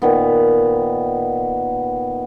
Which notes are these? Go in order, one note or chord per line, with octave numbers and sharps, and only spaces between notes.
A#2 D#3 B3